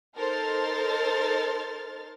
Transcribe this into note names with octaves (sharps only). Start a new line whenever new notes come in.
D#4 A4 A#4 C5 F6 A6